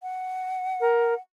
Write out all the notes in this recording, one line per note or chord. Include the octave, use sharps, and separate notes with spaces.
F#5
A#4